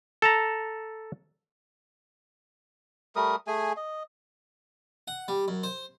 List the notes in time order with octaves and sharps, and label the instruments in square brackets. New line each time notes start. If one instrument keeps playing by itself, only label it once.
[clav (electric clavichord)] A4 A5 A#5
[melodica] G3 A3 A#4 D#6
A3 G#4 G#5
D#5
[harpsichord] F#5
G3
F#2
C5